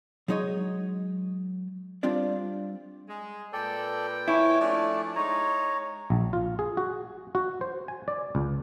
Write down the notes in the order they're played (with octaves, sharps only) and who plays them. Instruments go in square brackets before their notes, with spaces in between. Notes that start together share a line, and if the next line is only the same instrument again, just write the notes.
[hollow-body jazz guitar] F#3 G#3 D#4 C#5 D#5
G3 C4 D4 F4 D5
[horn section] G#3
[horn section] A#2 B4 G5 [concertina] A4 D5
[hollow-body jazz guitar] E4 [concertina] C#5 G#5 D6
[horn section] F3 C#4 D4 [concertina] A3 D5
[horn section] G#3 D#4 [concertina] C#5 A#5
[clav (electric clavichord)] A#1
F4
G#4
F#4
F#4
C5
G#5
D5
C#2